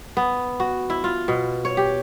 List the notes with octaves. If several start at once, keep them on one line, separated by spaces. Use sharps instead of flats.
B3
F#4
E4
F4
B2
C#5
G4